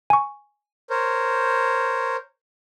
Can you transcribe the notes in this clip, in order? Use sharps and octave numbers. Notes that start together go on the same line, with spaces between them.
G#5 C#6
A#4 C5 C#5